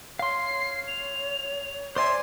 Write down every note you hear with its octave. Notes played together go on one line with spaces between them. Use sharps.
C#5 F5 C6 C7
F7
C5 D5 E5 G#5 C6